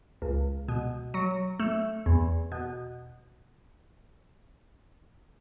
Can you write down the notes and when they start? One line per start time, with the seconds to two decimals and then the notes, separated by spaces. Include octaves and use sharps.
0.22 C#2
0.68 B2
1.14 F#3
1.60 A3
2.06 E2
2.52 B2